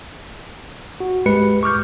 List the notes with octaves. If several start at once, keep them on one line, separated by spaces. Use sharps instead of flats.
F#4
G#3 G4 B4 C#7
C#6 D6 F6 G6